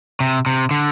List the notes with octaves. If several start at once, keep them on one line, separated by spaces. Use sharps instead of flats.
C3
C3
D3